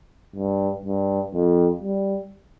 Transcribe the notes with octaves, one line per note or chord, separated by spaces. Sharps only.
G2
G2
F2
G3